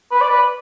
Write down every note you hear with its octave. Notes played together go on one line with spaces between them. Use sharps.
B4
D5
B4